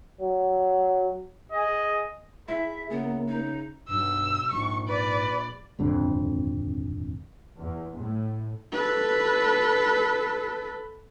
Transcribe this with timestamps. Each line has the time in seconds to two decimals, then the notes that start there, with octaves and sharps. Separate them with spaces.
0.21 F#3
1.52 G#4 D#5
2.48 E4 G#4 E5
2.90 C#3 A#3 B3
3.27 D#4
3.89 B1 G2 E6
4.52 A#1 G#2 C#6
4.88 B4 D5
5.79 D#1 G#1 F2 D3
7.59 E2
7.97 A2
8.72 A4 B4